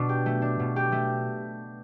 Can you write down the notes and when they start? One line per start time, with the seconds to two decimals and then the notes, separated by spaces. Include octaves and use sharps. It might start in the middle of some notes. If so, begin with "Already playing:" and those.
Already playing: B2 D4
0.09 G4
0.26 A3
0.42 D4
0.59 B2
0.76 G4
0.92 A3